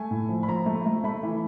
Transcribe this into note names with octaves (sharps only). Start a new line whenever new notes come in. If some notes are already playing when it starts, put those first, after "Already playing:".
Already playing: A3 G#5
A2
F3
B5
F3 A#5
A3
A3
A3 B5
E3